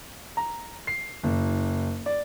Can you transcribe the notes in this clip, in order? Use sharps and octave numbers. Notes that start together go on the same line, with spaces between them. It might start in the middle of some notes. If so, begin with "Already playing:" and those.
A#5
C7
F#1
D5